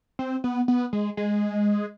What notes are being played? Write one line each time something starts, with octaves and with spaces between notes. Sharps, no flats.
C4
B3
B3
G#3
G#3